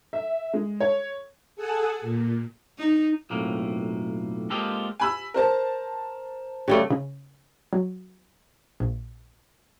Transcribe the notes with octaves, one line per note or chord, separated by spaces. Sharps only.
E5
G#3
C#5
G#4 A4 F#5 G#5 A5
A#2
D#4
B1 F2 A2 A#3
G#3 A#3 C4 F4 G4 A4
G#5 B5 E6
A#4 C5 A5
C#3 G3 A3 G4
C#3
F#3
A#1